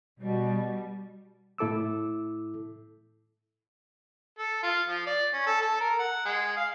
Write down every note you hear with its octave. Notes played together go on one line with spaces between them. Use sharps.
B2 G3
A2 E4 A4 D6 E6
A4
F4
F3
D5
C#4
A4
A4
A#4
F#5
G#3
F5